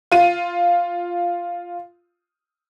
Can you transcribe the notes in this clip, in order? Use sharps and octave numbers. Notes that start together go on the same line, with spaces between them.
F4 D#7